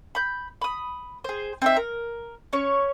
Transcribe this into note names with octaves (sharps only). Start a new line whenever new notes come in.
B5 G6
B5 D#6
G#4 C5
C4 D#4 E5
A#4
C#4 C#5